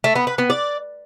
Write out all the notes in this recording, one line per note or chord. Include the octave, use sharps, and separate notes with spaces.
A3
B3
B4
B3
D5